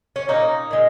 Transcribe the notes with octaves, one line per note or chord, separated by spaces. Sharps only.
C#4
A#2 A#3 C#4 D#4
A#2 G#3